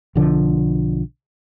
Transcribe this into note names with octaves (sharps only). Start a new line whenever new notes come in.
B1 D3 F3